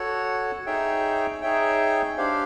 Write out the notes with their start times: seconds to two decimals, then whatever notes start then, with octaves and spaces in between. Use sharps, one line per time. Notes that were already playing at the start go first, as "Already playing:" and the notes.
Already playing: F#4 A4 C#5 F#5
0.66 D#4 G#4 C#5 E5 G5
1.42 D#4 G#4 C#5 E5 G5
2.17 D4 G4 C5 F5